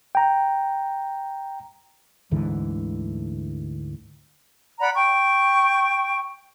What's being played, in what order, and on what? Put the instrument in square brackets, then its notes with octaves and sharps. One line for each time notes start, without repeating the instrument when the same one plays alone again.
[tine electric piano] G5 A#5
[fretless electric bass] D2 G#2 D3 E3
[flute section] D5 F#5 A#5 B5
G5 C#6